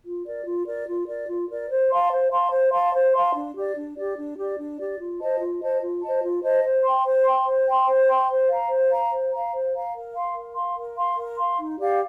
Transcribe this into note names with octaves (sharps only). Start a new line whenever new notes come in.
F4
A#4 D5
F4
A#4 D5
F4
A#4 D5
F4
A#4 D5
C5
F5 A5 C6
C5
F5 A5 C6
C5
F5 A5 C6
C5
F5 A5 C6
D4
G4 D5
D4
G4 D5
D4
G4 D5
D4
G4 D5
F4
C5 D#5 A5
F4
C5 D#5 A5
F4
C5 D#5 A5
F4
C5 D#5 A5
C5
G5 C6
C5
G5 C6
C5
G5 C6
C5
G5 C6
C5
F5 A#5
C5
F5 A#5
C5
F5 A#5
C5
F5 A#5
A#4
F5 C6
A#4
F5 C6
A#4
F5 C6
A#4
F5 C6
D#4
G4 D5 F5